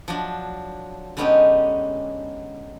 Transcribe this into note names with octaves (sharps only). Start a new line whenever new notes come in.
F3 F#3 D4
D3 G#3 B3 C#4 D#4 G4